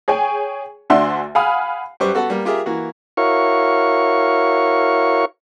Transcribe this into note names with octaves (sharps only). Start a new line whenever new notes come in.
G#4 C#5 G5 G#5
D2 D4 F#4 E5 C6 E6
F5 F#5 G#5 B5 D#6 F6
F#2 G3 G4 B4 C5 C#6
B3 F#4 A4 B4 F#5
G3 A#3
F4 G4 G#4 A#4 E5
E3 A#3 F#4
E4 F#4 A#4 C#5 F5 C#6